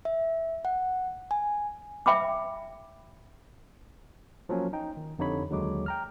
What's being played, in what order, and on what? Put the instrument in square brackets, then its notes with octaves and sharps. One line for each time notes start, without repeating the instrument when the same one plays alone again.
[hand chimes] E5
F#5
G#5
[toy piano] E5 G5 B5 D6
[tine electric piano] F3 F#3 A#3 C#4
D#4 G5
D#3
F2 D3 D#4 G4 C#5 B5
D#2 D3 F#3 G#3 D6
G5 A#5 F6